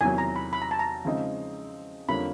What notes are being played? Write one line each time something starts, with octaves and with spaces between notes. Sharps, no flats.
E2 C3 D#3 F#3 G#5
A#5
B5
B5
A#5
A5
A#5
C#3 F3 G#3 C4 D#4
F2 D3 G3 A#3 C#4 B5